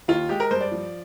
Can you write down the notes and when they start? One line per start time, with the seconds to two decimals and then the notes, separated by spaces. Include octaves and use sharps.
0.08 D#2 F4
0.29 G#3 G4
0.40 A#4
0.51 G2 C5
0.61 D5
0.72 F3